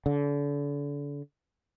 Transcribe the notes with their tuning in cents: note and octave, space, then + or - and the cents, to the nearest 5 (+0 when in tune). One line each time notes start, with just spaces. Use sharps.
D3 -35